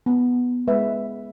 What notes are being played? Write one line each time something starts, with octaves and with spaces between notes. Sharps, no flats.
B3
G#3 B4 E5